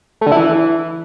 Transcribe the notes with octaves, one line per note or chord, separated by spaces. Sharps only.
A3
D3
E4
E3